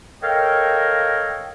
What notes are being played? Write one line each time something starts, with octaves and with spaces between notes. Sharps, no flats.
A4 A#4 C#5 D#5 F5 G5